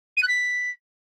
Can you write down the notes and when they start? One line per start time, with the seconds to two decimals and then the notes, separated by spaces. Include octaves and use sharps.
0.17 D#7
0.22 F#6
0.28 B6